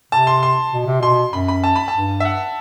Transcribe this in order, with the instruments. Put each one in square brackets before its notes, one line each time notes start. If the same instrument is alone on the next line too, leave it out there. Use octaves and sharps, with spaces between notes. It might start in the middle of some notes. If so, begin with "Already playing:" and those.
[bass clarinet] C3 [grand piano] A5
[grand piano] C6
C6
[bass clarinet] B2
C3
[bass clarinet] B2 [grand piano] C6
[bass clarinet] F#2 [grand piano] B5
[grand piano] B5
A5
B5
A5
[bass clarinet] G2
[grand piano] E5
F#5